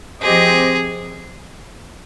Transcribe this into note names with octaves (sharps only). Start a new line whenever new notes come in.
F3 C4 G4 G#4 C5 D#5